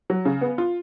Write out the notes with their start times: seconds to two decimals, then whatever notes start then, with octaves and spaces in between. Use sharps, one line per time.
0.10 F#3
0.25 C#3
0.41 B3
0.58 F4